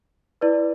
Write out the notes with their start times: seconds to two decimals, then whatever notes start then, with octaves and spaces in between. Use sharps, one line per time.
0.41 E4 B4 D5